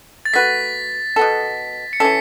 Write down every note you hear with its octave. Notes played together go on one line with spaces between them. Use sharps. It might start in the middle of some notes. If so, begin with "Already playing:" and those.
A6
A3 F#4 B4 B6
B2 B3 A4
C#7
E3 C#4 A4 B6